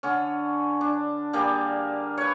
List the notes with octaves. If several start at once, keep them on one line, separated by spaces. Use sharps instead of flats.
D3 C#4
D4
G3 A#3 G#4 D5
B4 C#5